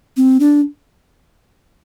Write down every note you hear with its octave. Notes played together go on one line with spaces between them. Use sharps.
C4
D4